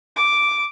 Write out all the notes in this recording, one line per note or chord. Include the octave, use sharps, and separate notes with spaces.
D6